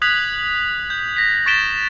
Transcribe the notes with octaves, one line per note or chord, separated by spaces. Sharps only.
D#6 F#6 G#6 B6 F7 F#7
G6
A#6 B6
C#6 A6 B6 D7 E7 G7